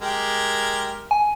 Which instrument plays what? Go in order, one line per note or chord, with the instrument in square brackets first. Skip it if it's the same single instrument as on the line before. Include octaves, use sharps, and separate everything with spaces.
[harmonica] G#3 G4 A#4
[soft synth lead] G#5